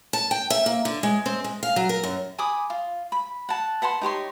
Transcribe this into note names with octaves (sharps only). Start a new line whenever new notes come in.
A5
G5
E5
A#3
D3
G#3
C4
G#3
F5
F#3
A#4
F#2
G#5 B5 D6 D#6
F4
B5
F#5 A5
B4 F#5 A5 C6
D#4 G4 C#5 C6